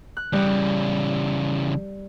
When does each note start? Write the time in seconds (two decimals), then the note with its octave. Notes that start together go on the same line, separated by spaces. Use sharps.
0.17 F#6
0.33 C#3 E3 G3